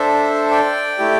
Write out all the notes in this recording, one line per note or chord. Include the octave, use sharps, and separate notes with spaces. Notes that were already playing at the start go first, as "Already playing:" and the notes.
Already playing: D4 A4 C5 E5
D5 G5
A3 E4 G4